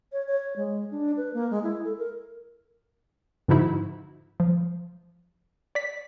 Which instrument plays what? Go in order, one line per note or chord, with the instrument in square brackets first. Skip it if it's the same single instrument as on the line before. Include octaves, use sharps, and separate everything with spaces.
[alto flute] C#5
C#5
G#3
D4
B4
A#3
G#3
E4
A4
A#4
[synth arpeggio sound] G#2 D3 F3 D#4 E4 F#4
F3
D5 B6